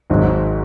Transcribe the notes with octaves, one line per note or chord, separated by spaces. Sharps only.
G#1 G#2 F#3